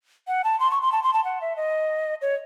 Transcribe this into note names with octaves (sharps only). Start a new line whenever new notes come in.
F#5
A5
C6
C#6
C6
A5
C6
A5
F#5
E5
D#5
C#5